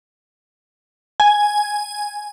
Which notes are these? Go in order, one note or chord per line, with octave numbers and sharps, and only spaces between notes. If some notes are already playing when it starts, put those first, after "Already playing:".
G#5